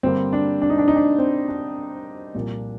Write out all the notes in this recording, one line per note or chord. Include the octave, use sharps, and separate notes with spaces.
G2 D3 G3 A#3 C4
D4
D4
D#4
D4
D#4
D4
C4
D4
C2 A#2 F3 A#3